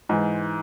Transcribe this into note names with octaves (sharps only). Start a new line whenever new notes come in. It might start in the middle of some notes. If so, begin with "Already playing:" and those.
G#2 E3